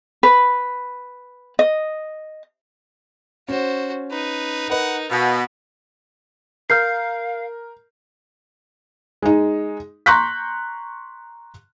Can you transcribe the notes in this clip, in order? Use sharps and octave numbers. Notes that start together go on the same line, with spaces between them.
B4
D#5
C#4 F#4 C5
D#4 B4
A#4 B4 D#5 F#5
B2 F5 B5
A#4 F5 F6 G6 C7
G#3 D#4
A#5 C6 C#6 F#6 G6 B6